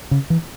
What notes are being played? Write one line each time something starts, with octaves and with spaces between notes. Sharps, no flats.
C#3
E3